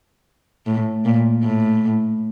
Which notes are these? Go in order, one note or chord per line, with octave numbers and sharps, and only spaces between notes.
A2
A#2
A2